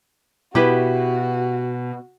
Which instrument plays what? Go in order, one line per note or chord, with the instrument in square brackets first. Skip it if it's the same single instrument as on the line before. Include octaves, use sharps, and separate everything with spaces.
[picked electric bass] B2 [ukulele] E4 G4 B4 [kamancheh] F#4